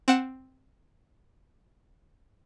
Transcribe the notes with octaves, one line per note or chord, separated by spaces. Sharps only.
C4 F#5 E7